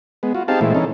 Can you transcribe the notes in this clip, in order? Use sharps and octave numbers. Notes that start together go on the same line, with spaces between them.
G#3 B3
F4 F#4
C4 D#4 G4 G#4 F5 A5
A#2 E3 G#3 A3 C4 E4
E3 C#4 D#4 A4